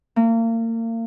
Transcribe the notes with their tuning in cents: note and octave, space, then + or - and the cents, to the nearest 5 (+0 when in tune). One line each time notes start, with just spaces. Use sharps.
A#3 -35